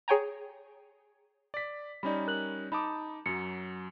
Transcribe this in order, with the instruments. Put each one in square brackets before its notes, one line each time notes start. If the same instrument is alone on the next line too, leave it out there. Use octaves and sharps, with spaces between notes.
[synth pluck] G#4 C#5 G5 G#5 A#5
[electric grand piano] D5 B6
[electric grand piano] G3 C#4 D#4 [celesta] D5 B5
[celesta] A#4 F#6 F#7
[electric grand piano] D#4 A5 D6 [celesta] B5 D#6
[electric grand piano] F#2 F#3 [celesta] C#7